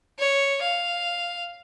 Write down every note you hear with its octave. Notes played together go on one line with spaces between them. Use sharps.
C#5
F5